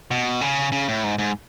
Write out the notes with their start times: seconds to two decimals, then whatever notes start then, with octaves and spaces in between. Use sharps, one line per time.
0.11 B2
0.41 C#3
0.72 C#3
0.88 A2
1.04 G#2
1.18 G#2